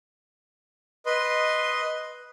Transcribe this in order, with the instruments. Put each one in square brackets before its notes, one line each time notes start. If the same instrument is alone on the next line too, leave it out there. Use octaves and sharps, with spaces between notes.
[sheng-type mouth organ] B4 D#5 C6